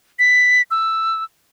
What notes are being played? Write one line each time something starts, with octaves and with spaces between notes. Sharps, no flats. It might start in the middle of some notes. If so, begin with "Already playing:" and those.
B6
E6